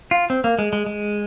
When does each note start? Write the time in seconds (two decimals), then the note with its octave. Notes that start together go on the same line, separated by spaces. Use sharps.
0.11 F4
0.30 C4
0.44 A#3
0.59 G#3
0.73 G#3
0.86 G#3